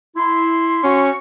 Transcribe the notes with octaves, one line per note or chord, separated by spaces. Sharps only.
E4 C6
C#4 F#4 C#6